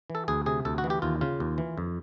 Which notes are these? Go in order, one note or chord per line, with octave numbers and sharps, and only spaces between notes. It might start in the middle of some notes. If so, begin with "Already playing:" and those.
E3
A4
D2 G#4
C3 G#4
D2 A4
F#4
E3
G4
D#2 F4
C#3 F4
D#2
E3
F2